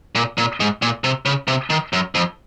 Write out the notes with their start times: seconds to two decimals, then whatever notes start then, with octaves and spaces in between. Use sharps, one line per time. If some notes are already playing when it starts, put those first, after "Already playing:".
0.15 A#2
0.38 A#2
0.60 G#2
0.82 A#2
1.04 C3
1.25 C#3
1.48 C3
1.70 D#3
1.93 F#2
2.15 F2